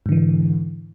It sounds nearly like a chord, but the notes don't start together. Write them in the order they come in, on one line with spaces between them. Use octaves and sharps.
G#2 D3 E3